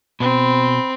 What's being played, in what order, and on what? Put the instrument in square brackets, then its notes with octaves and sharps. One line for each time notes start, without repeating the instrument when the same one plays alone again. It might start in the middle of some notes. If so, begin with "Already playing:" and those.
[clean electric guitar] B2 [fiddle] C4 [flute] B5